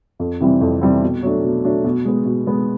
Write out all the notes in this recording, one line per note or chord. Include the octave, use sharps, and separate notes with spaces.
F2
C3 E3 G3 C4
F2
C3 E3 G3 C4
B2
F#3 A3 D4
B2
F#3 A3 D4
B2
G#3 B3
B2
G#3 B3